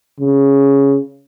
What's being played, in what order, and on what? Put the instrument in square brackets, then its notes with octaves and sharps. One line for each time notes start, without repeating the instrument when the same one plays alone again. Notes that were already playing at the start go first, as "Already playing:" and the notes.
[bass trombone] C#3